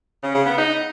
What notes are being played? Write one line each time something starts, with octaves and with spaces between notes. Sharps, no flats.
C#3
C#3
B3
D#4